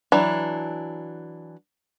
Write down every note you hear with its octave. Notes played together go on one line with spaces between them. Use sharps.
E3 F#3 D4